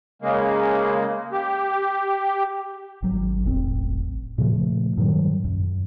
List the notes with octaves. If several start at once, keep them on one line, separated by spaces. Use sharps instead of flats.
C#3 G#3 A#3
G4
G#1 F#3
E1 A1 C4
A#2 C#3 F3 A3
G2 A#2 D#3 F#3
F#2